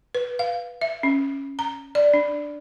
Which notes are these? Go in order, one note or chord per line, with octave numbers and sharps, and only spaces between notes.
B4
F5
E5
C#4
A#5
D5
D4